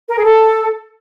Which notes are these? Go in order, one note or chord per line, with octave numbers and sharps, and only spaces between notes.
A#4
G#4
A4